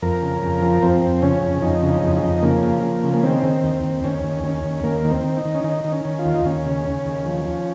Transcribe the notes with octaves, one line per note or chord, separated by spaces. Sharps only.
F2 A#4
C#3
F2
F3
F2 C4
F2
C#3 C#4
F2
F2 D#4
C#3
D#4
F2
D#4
F2
C#3 A#3
F3
F3
C#3
A#3
D#3 C4
D#3
D#2
D#2
D#2 C#4
D#2
D#2 C#4
D#2
D#2 A#3
D#3
C4
D#3
D#4
D#3
C#4
D#3 D#4
D#3
C#4
D#3
F4
D#2
D#4
D#2 C#4
C#3
C#3
D#2
F3
F3